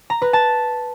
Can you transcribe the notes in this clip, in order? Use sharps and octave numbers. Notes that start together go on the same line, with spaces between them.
A#5
B4
A5